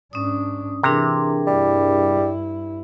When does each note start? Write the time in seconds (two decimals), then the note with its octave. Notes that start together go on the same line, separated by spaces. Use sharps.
0.13 G#2 C#4 D4 D#6
0.83 C3 E3 D4 G#4 A#4
1.47 G2 G3 E4